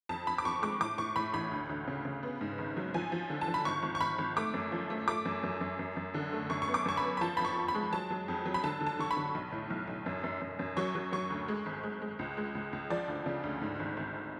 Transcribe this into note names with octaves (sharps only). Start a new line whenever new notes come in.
F2 A5
F2 B5
D6
F2 C#6
G#3 D6
A2 D6
A2 C#6
A2 B5
A1 B5
D2
D2
C#3
C#3
B3
G#2
G#1
F#3
F3 G#5
F3
D3
A5
F3
B5
G#1 C#6
G#1
C#6
G#1 B5
G#1
A3 D6
F#2
F3
A3
A3 D6
F#2
F#2
F#2
F#2
F#2
D3
A3
F#2 C#6
C#6
B3
D6
F#2 C#6
B5
B3
B5
F3 A5
F2 B5
C#6
F2
B5
G#3
F#3 A5
F#3
F2
F#3
B5
D3 A5
D3
A5
D3 C#6
B5
D3
B1
A2
B1
B1
F#2
F#2
F#2
F#2
F#3 C#6
F#3
F#3 C#6
D2
G#3
G#1
G#3
G#3
C#2
G#3
C#2
C#2
F3 D5
D2
C#3
D2
G#2
G#1
G#1